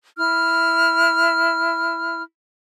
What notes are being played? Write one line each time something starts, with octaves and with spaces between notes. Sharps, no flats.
E4 F6